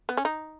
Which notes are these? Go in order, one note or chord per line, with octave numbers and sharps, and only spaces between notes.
B3
C#4
D#4